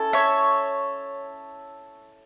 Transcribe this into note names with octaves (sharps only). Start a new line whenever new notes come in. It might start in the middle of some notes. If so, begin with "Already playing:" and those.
Already playing: C#4 E4 A4
C#5 E5